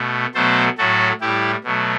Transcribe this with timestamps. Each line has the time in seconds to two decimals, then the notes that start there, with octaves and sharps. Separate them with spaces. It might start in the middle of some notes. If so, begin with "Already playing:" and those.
Already playing: B2 A3
0.34 B2 F#3 A3 A4 C5
0.78 A2 F#3 A3 F#4 A4
1.21 A2 G3 E4 G4
1.64 B2 F#3 A3